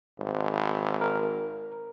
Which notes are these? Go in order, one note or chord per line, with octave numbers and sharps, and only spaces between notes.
G#1
A#4